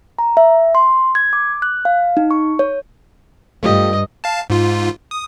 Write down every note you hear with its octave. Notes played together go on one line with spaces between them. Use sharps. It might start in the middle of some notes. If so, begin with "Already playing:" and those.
A#5
E5
C6
G#6
D6
F#6
F5
D#4
C#6
C#5
G2 A3 F4 G4 D#5
F5 A5
G#2 F4
D#6